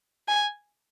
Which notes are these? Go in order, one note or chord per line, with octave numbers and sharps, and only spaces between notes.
G#5